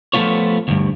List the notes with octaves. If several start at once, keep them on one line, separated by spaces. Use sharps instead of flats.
F3 F#3 A3 B3 F4 C#5
D2 G2